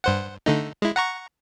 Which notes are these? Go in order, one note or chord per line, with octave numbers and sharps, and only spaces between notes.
G2 C5 F#5
D3 A3 D#4
G#3 E4
F#5 A#5 C#6